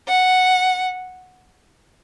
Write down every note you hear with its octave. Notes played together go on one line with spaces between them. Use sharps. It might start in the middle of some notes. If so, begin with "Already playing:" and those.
F#5